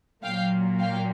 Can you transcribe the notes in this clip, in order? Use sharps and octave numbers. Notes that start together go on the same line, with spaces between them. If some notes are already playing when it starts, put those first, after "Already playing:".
A#2 F#3 A#3 F5 G5
F5 G5